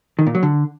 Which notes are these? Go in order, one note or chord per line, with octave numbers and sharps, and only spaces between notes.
D#3
A#2
F#3
D3